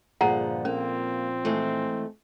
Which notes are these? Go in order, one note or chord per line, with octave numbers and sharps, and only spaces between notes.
G2 A#2 D3 F3 G#4 F#5 A#5
A#3 C4 C#4
E3 G#3 A3